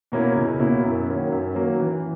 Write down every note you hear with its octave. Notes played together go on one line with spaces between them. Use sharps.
B2 A#3 C#4 E4
C#2
B2 A#3 C#4 E4
F#2
D#3 F#3 A#3 C#4
F#2
D#3 F#3 A#3 C#4
E3